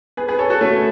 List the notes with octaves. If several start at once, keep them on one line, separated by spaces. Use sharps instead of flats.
G#4 B4
G#4 B4
A4 C#5
F#4 A4
A3 C#4